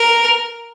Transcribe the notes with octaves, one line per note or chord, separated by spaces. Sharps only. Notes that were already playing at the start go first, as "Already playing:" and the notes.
Already playing: A#4